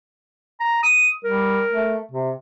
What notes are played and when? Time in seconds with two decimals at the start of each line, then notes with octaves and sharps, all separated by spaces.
0.60 A#5
0.83 D#6
1.24 G3 A#4
1.72 A3
2.12 C3